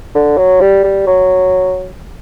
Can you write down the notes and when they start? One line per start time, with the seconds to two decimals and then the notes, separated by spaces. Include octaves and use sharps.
0.15 D3
0.38 F#3
0.61 G3
0.84 G3
1.07 F#3